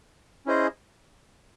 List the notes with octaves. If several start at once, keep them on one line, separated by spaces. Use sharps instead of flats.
C#4 E4 G#4 C5 D#5